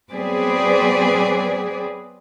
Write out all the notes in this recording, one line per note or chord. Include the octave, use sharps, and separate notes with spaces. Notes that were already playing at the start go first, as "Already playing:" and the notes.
F#3 B3 C4 G#4 B4 D5